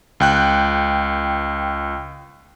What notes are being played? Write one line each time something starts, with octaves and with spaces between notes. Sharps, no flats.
C#2 G5 F#6